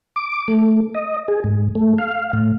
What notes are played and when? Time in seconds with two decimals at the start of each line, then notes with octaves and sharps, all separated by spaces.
0.16 D6
0.48 A3
0.94 D#5
1.28 G#4
1.44 G#2
1.75 A3
1.98 F5
2.33 A2